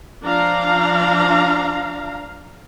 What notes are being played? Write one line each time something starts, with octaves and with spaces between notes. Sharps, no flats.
F3 D4 F5 A#5